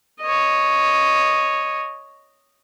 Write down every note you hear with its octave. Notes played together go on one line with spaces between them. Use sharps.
C#5 D#5